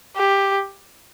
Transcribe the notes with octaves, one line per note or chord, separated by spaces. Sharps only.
G4